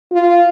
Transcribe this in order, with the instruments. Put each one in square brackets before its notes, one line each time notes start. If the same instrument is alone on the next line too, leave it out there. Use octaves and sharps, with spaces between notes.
[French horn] F4